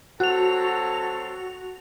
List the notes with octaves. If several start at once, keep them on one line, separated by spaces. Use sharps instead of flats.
F#3 C4 F#4 A4 F7